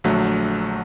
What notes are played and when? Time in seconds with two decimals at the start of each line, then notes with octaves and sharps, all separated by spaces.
0.04 A#1 D3 F#3 A3